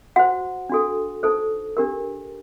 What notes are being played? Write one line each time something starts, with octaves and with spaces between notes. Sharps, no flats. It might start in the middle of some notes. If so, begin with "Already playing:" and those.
F#4 C5 F#5
D4 F#4 A4
D#4 A4 C5
D4 G4 A#4